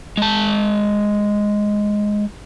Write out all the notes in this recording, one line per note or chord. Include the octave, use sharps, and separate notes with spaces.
G#3 A5